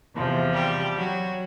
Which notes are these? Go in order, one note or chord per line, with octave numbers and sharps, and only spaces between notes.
E2 C3 F3
G3 G4
F#3 F#4